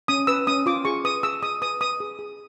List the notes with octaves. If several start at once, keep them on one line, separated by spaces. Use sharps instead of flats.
C#4 D#6
B4 E6
C#4 D#6
F4 D6
G#4 C#6
B4 D#6
G#4 E6
G#4 D#6
B4 D#6
B4 D#6
G#4
G#4